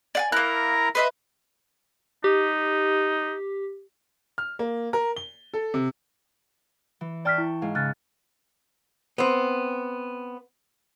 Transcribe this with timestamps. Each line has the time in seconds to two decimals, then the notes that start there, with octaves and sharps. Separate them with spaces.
0.15 D5 F#5 G#5
0.32 A#3 E4 A#4 A#5 F#6
0.95 B4 D#5 E5 C6
2.24 D#4 G4
4.38 F6
4.59 A#3
4.93 A#4
5.16 G7
5.54 A4
5.74 C3
7.01 E3
7.25 D5 G5 A5 C#6 F6 B6
7.38 E4
7.62 G#2 F5
7.75 C#3 F6 F#6 A6
9.18 B3 C4